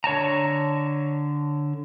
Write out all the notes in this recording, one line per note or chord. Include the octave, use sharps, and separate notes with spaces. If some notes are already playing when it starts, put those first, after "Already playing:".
D3 C#5 A5 A#5